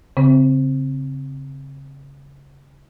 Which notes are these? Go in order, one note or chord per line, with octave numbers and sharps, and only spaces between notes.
C#3 C4